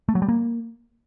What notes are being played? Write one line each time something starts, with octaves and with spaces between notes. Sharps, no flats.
A3
F#3
G3
A#3